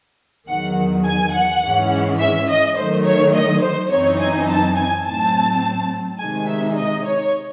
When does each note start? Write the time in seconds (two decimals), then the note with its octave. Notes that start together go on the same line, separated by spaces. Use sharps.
0.47 E2 D#3 F#3 F#5
1.05 G#5
1.33 F#5
1.62 G#2 E3 G#3 C#4
2.19 E5
2.48 D#5
2.77 D#3 F#3 A3 C5
3.05 C#5
3.34 D#5
3.62 C5
3.90 F#2 E3 C4 D#4 C#5
4.19 G#5
4.48 A5
4.76 G#5
5.06 A2 F#3 C4 A5
6.19 C3 D#3 G#3 D#4 G#5
6.48 E5
6.76 D#5
7.05 C#5